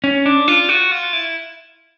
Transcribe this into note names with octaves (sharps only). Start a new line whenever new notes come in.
C#4
D4
F4
F#4
F4
E4